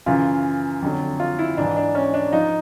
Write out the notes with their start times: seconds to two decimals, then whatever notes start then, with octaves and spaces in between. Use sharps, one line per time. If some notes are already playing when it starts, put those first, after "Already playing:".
0.06 F#2 C#3 E3 F4
0.82 F2 D3 F#3
1.20 F4
1.39 E4
1.57 G#2 E3 D4
1.76 D4
1.95 C#4
2.14 D4
2.33 F3 D#4